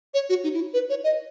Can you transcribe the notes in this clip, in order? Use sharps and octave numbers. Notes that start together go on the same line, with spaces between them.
C#5
F#4
D#4
E4
B4
C#5
D#5